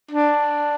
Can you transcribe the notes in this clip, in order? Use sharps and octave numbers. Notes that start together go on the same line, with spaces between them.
D4